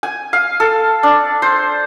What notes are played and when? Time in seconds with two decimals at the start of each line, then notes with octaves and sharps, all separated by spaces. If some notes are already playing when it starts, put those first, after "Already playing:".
0.03 G#5
0.33 F5
0.60 A4
1.03 D4
1.42 C5